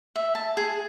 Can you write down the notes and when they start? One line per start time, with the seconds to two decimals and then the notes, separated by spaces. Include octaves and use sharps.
0.16 E5
0.35 A5
0.57 G#4